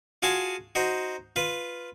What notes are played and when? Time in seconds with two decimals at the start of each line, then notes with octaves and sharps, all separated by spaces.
0.22 F4 F#4 G#4 G#5 A5
0.75 D#4 F#4 C5
1.36 F4 B4